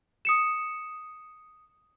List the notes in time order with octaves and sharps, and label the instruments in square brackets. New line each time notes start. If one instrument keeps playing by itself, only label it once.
[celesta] D#6 C#7 E7